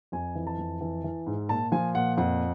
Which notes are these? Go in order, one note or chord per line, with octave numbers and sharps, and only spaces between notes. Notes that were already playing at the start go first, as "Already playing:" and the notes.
F2 G#5
E3
A5
F2
E3
E3
G#2
A#2 A5
F3 G#5
A#2 F#5
F2 F#5